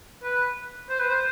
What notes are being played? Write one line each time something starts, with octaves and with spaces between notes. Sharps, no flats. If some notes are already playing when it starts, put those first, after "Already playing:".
B4
C5
B4
C5